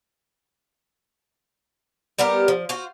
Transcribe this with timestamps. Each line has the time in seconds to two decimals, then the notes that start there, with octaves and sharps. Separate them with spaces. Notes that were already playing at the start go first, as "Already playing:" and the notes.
2.19 G3 B3 G4 A#4
2.48 F3
2.69 F4 F#4 C5